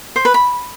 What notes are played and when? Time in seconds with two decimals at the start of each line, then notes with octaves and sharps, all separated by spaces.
0.16 C5
0.25 B4
0.34 B5